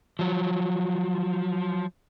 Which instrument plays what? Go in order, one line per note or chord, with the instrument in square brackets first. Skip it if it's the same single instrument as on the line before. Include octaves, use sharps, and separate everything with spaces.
[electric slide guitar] F3 F#3